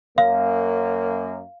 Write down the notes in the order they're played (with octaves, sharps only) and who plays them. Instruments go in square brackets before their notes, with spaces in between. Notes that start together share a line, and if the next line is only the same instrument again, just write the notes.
[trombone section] F#2 A#3 [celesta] F5